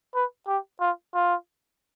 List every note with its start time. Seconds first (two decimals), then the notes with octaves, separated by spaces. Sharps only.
0.15 B4
0.47 G4
0.81 F4
1.15 F4